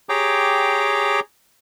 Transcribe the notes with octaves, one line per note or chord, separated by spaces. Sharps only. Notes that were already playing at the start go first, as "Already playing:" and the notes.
G4 G#4 C#5 G5 A#5 D6